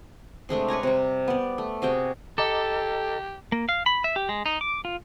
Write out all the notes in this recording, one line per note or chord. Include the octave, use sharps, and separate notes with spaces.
C3 G#3 A3 D4
B4 C#5 G#5 A#5
C3 G3
B3 D5
A3
C3 F#4 G#4 G5
G4 A4 D#5 A#5 D6
A#3
F5
B5
E5
G4
G#3
D#4
D6
F4